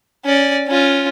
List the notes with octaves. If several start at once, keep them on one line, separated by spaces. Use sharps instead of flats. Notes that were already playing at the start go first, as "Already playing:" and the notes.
C#4 D5
C#4 F4